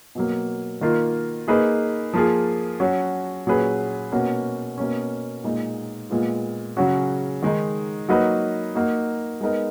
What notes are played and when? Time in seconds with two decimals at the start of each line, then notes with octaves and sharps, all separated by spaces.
0.15 B2 F#3 A#3
0.81 D#3 A#3 F4 A#4
1.48 A#3 D#4 G#4 B4
2.13 F3 A#3 F4 G#4
2.80 F#3 C#4 F#4
3.47 A#2 F#3 C#4 G#4 B4
4.12 B2 A#3 C#4 F#4
4.78 B2 A#3 C#4
5.44 A#2 G#3 D#4
6.10 A#2 G#3 B3 F4
6.77 C#3 F#3 C#4 F#4
7.43 D#3 G#3 D#4
8.09 F#3 A#3 D#4 F#4 B4
8.75 A#3 D#4 F#4
9.41 G#3 B3 D#4 A#4